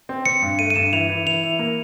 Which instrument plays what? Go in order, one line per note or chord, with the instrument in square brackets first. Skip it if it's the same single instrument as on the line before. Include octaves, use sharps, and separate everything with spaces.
[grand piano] C4
[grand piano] C4 [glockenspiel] C#7
[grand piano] G2
[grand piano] A3 [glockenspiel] D#7
[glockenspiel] D#7
[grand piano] G2 [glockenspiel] E7
[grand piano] E3 [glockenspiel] F7
[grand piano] E3
[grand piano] E3 [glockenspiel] F7
[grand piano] E3
A#3